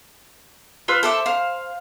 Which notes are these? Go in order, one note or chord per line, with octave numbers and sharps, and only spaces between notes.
F4 B4 E6
A4 C5 E5 D6
C5 F5